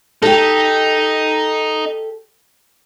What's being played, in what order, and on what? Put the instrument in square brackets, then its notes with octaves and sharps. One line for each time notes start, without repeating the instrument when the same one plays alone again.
[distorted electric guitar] D#4 [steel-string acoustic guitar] G4 A4